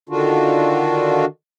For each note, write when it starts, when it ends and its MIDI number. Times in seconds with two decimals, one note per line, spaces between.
0.09 1.25 50
0.09 1.25 51
0.09 1.25 62
0.09 1.25 65
0.09 1.25 66